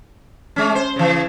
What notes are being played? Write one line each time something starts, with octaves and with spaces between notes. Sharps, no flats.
G#3 C#4
C5
C#3 E3